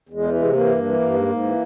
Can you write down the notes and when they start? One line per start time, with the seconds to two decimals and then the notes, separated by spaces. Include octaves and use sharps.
0.09 E2 G#3
0.24 E3
0.34 C3 G#3
0.53 E3 A#3
0.69 G2
0.83 E3
0.99 G2
1.14 G#2
1.28 G#2
1.43 E3